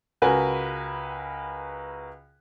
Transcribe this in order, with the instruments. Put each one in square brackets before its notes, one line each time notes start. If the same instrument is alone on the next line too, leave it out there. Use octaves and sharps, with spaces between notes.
[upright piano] C#2 F#4 A#4 B4 G#5